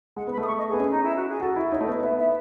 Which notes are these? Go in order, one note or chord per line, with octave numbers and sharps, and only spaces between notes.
G#3 F#5
B3
B5
A3
D#6
C#6
D#5
B3 G#4
C#4
D#4
E4
F#4
G#4
F#4 A4
E4
D#4 C#5
A3
B3 D#5
B3 E5
E5